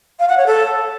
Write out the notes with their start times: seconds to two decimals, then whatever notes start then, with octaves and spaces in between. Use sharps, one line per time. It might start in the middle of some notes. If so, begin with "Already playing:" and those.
0.19 F5
0.28 F#5
0.37 C#5
0.46 A4